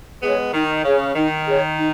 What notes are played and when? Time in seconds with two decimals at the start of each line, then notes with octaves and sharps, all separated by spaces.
0.23 G#3 B3 G#4 C#5
0.54 D#3 D#4
0.84 C#3 G#4 C#5
1.16 D#3 D#4
1.47 G#4 C#5
1.78 D#4